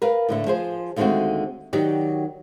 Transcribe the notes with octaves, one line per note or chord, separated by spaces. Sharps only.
A#4 B4 F5
A2 D3 A3
F3 G#4 C5
D#2 D3 G#3 A3 C4 F#4
D#3 F#3 F#4 G4 D5